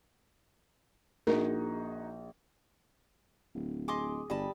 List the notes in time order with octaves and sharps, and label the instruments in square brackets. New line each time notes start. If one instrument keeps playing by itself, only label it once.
[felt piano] A#1 [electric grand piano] D#4 F#4 G#4 [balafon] A#4
[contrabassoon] D1
[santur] G#4 [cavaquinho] D#5 C6 D6
[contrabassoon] G1 [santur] G3 [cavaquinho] D#5 A5 B5